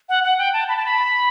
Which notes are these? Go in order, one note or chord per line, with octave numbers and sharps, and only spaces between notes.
F#5
F#5
G5
A5
B5
A5
B5